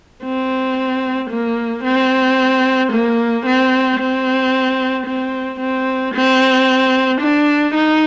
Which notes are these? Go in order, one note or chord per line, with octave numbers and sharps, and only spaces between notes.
C4
A#3
C4
A#3
C4
C4
C4
C4
C4
D4
D#4